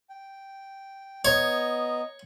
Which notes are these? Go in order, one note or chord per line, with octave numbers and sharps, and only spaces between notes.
G5
B3 C#5 D#5 A#5